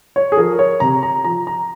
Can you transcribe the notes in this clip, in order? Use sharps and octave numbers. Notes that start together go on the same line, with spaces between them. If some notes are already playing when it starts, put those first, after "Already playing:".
C#5
G#4
F3 A#4
C#5
C3 A#5
A#5
F3 A#5
A#5